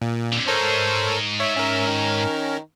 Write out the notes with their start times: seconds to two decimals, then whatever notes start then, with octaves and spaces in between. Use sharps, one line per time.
0.02 A#2
0.33 F2 D3
0.48 G#2 D#4 A4 A#4 C5 C#5
1.40 C#5 E5
1.56 C#4 A#4
1.88 D#3